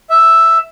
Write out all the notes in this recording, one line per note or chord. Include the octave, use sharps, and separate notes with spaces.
E5